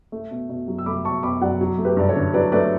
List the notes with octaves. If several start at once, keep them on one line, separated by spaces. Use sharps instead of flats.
A3
B2
B2
F#3
E6
A3 B5 D6
B2 A5 C#6
B2 B5 D6
F#3 D5 F#5
F#3
A3
G4 B4
G2 D5
A4 C#5
D3
F#3 B4 D5
A3 B4 D5